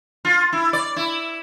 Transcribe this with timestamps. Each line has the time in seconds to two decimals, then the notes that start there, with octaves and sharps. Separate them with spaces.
0.25 F4
0.53 E4
0.73 D5
0.96 E4